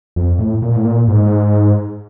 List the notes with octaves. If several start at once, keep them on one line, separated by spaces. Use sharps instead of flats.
F2
A2
A#2
A2
A#2
G#2